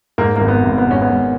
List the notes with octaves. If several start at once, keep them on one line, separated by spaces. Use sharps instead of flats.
G#2 A#3
A#3
G#1
B3
G#1
B3
G#2 C#4
B3
G#1